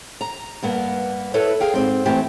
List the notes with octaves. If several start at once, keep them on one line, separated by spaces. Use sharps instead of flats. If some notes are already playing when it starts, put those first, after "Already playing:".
A#5
G2 A#3 B3
E4 A4 B4 C#5
G#4 F5 G5
G#2 C4
E3 A3 C4 G4